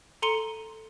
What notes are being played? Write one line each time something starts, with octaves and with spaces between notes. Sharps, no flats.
A4 A#5 C6 C#7 D#7 G7